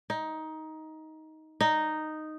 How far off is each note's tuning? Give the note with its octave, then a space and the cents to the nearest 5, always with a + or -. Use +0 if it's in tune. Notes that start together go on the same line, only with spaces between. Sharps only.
D#4 +15
D#4 -5